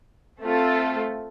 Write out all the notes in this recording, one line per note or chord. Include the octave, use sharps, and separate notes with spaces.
A3 C4 F4 A4